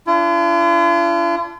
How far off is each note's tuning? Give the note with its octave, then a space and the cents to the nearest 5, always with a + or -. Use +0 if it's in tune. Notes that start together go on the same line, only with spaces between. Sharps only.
D4 -15 F4 -45